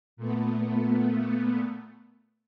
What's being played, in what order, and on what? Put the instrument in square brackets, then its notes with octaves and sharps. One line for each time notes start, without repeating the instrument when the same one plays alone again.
[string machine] A#2 A3 B3